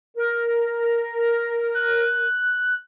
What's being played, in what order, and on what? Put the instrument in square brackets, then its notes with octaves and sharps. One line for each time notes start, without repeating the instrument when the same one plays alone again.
[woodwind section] A#4
[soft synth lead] F#6